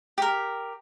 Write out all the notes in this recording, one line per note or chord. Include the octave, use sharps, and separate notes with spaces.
G4 A#4